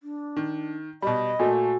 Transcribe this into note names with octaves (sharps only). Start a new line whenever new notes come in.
D4
D#3
B2 G3 D#5 B5
A#2 A3 F#4 A4 G#5